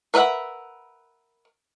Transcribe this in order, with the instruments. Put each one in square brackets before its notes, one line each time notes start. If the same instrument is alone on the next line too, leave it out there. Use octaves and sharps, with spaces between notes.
[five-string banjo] A#4 B4 D#5 E5 F#5